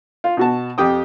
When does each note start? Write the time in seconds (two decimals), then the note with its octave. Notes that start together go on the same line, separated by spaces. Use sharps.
0.24 F4
0.37 B2 F#4 A5
0.78 F2 G4 G5 D#6